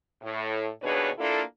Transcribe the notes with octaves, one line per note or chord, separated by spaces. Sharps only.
A2
D#2 B2 D4 G#4 B4 C#5
A#3 D4 E4 F4 A4